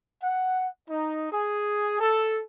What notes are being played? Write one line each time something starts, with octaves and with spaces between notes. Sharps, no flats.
F#5
D#4
G#4
A4